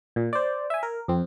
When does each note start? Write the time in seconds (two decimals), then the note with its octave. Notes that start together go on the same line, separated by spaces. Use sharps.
0.16 A#2
0.33 C5 D5
0.70 E5 G#5
0.83 A#4
1.08 F2 C4